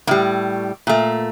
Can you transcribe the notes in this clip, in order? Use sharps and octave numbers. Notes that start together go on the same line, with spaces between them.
A2 G3 A#3
A#2 A3